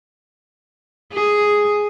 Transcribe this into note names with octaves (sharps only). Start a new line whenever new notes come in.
G#4